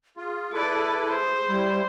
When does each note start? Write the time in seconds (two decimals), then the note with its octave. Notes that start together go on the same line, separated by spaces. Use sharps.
0.17 F4 G#4
0.53 E4 A4 B4 D5
1.10 C5
1.48 G3 E4